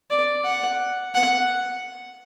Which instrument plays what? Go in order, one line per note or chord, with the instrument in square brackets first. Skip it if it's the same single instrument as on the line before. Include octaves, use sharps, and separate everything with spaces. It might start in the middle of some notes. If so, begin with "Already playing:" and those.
[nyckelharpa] D5
F#5
F#5